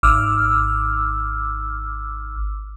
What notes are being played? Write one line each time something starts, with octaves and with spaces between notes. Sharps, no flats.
G#1 D6 E6 F6